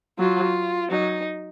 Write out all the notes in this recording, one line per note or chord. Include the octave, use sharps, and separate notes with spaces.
F#3 F4
F#3 D#4